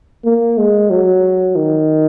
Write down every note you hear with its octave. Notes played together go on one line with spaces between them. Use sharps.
A#3
G#3
F#3
D#3